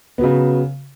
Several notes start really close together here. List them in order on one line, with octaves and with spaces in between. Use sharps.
B3 F#3 C#3